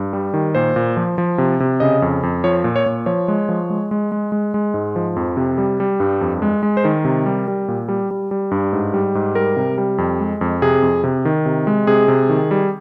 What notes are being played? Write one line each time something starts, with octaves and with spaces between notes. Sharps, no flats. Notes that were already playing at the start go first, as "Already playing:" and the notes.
Already playing: G2
G3
D#3
A#2 C5
A#2
F3
F3
C3
C3
C#3 D#5
F2
F2
F3 C#5
A#2
C#5
A#2
F3 C#5
G#3
F3
G#3
G#3
G#3
G#3
G#3
G#2
F3
F2
C3
G3
G3
G2
F2
G#3
G#3
C5
D#3 A#4
C3
G3
G3
A#2
G3
G3
G3
G2
G#2
G3
G#2
G3 A#4
C3
G3
F2
G#3
F2
C3 G#4
F2
C3
D#3
C3
G#3
C3 G#4
C3
D#3
G3